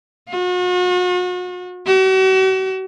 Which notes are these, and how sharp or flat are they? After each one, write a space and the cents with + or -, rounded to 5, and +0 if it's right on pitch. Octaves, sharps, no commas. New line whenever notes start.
F#4 -40
F#4 +40